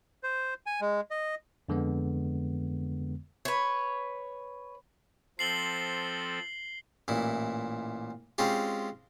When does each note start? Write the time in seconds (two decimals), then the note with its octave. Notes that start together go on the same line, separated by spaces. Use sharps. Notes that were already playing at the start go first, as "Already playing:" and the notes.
0.23 C5
0.66 G#5
0.81 G#3
1.11 D#5
1.69 F2 D3 G#3 B3
3.45 B4 C#5
5.39 F3 C4 A4 C7 F#7 G7
7.08 A1 A#2 E4
8.38 G#3 C4 C#4 F4 G4